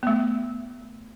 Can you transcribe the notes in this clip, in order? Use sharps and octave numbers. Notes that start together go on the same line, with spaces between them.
A3 B3